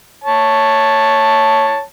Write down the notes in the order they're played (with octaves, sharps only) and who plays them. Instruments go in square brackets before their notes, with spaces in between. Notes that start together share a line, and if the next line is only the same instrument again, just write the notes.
[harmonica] C#5 A5